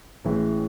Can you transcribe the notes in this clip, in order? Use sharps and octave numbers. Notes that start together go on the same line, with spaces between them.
A1 A2 E3 G#3